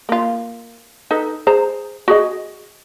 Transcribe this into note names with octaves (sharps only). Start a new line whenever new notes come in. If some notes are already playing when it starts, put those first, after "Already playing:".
A#3 F4
D#4 A4 B4
G#4 C5 A#5
F#4 G#4 D#5